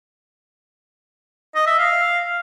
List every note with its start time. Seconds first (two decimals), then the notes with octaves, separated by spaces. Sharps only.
1.55 D#5
1.67 E5
1.78 F5